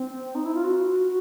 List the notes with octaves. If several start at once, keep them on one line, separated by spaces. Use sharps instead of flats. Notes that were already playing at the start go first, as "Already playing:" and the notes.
Already playing: C4
D#4
E4
F4
F#4